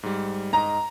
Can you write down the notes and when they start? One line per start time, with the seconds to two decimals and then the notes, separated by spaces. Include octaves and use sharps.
0.03 G#2 G3
0.53 G#2 D#5 A#5